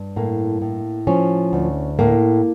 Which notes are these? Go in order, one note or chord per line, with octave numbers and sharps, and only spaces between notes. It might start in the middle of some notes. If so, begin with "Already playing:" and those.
Already playing: G2
A2 A#3
A2
F3 C#4
D2
A2 A#3